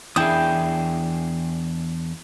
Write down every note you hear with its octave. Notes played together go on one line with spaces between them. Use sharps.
E2 D4 E4 G#4 G5 D#6